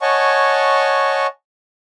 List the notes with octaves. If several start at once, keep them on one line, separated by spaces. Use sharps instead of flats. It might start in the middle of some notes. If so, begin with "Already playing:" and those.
C#5 D#5 F#5 G#5 A5 C#6